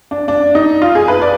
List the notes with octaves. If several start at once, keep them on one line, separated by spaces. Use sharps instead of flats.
D4
D4
D#4
F4
G#4
B4
D5